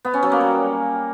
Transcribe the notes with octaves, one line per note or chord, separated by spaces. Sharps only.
B3
C#4
F#3
A#3
G3